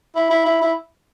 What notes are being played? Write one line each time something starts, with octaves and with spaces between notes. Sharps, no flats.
E4
E4
E4
E4